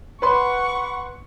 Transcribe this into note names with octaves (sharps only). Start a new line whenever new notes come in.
B4 F#5 C6 C#6